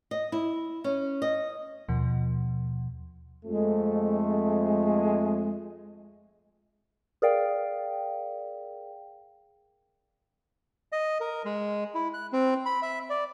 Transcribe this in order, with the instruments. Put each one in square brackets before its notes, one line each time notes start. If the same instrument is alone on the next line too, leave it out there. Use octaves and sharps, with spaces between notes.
[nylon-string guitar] D#5
E4
C#4
D#5
[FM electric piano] D#2 B2 F3
[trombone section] F2 A3 [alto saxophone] G#3
[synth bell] G#4 A#4 D5 F5 G5
[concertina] D#5
A#4
G#3
E4
F#6
C4
B5
E5
D5